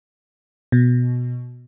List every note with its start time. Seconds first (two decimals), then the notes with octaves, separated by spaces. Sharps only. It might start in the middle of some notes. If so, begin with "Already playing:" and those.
0.72 B2